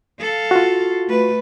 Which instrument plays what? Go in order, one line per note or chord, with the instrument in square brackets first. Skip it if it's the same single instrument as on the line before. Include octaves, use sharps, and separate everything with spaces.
[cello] A4 F5
[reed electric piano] F4 F#4
[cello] A3 B4